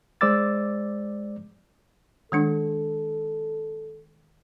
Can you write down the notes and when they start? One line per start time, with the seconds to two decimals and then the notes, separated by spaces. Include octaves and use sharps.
0.21 G#3 C5 D5 D6 E6 A6
2.32 D#3 G#3 D4 A4